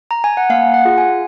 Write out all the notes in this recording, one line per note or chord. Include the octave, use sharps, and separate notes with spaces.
A#5
G#5
F#5
A#3 F5
F#5
F4 G#4
G#5